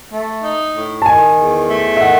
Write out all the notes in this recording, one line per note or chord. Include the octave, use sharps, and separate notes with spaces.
A3
D#4
A2
A5
D#3 G#5
E2
A3
E5
D#3 F#5